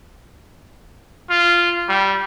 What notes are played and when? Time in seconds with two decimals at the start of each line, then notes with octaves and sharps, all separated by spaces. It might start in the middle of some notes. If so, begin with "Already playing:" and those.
1.30 F4
1.89 G3